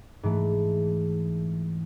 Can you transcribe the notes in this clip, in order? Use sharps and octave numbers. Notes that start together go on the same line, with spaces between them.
G#2 E3 A3